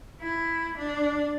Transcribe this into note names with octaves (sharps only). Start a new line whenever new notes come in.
E4
D4